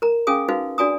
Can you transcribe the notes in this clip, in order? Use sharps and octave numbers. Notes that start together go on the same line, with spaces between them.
A#4 A#5
C#4 G#4 F5 G#5 D#6
D#4 F#4 B4 F5
D4 F#4 D5 G#5 A#5 D#6